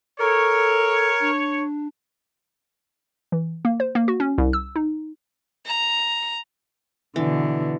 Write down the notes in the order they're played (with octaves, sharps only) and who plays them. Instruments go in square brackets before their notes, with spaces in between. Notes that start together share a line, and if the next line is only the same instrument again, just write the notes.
[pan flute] A4 [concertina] A#4 [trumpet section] C#5
[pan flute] D4
[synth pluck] E3
A#3
C5
A#3
F#4
C#4
C2
E6
D#4
[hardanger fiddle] A#5
[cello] B2 D3 [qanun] E3